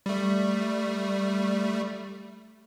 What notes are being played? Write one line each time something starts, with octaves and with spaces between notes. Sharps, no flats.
G3 A3